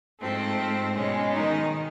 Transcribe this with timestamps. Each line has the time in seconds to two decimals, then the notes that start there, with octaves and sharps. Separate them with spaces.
0.20 G#2 F3 A3 C4
0.95 B2 G#3 C#4
1.33 D#3 D#4